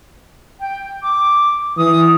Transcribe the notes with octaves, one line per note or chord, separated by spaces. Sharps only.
G5
D6
E3 D#6